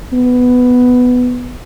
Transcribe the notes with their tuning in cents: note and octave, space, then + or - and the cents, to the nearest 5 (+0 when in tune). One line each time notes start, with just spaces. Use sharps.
B3 +10